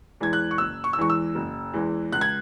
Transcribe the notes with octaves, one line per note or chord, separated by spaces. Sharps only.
E2 E3 G#3 G#6
F#6
C#6
F#1 E6
C#6
E6
E2 E3 G#3 C#6
E6
F#1
E2 E3 G#3
C#2 F#6
G#6